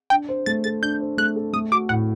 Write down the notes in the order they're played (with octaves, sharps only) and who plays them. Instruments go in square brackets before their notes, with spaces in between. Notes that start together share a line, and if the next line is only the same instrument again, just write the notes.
[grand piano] D4 [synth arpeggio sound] G5
[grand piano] C5
[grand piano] A3 [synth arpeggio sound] A6
[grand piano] A4 [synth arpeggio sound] A6
[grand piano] D4 [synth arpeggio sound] G6
[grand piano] C5
[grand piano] A3 [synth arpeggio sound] F#6
[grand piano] A4
[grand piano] A3 [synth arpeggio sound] D#6
[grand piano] F#4 [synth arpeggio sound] D6
[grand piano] A2 [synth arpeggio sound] F#5